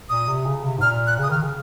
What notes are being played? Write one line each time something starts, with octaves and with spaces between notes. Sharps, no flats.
A#2 D#6
C3
C#3
C3
G#2
A#2 F6
F#6
C#3 D#6
D#3 F6
C#3